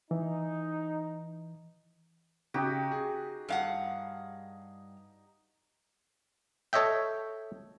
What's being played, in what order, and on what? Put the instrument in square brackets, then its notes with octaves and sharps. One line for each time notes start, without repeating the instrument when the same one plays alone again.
[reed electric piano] E3 [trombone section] D#4
[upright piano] C#3 [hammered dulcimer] D#4 F#4 G4
[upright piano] G#4
[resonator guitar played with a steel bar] G2 F5 F#5
[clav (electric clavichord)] A4 C#5 D#5 E5 G5